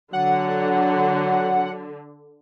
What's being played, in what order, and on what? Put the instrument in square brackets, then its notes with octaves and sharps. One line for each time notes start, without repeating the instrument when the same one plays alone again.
[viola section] D3 [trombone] F#3 [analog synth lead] F#5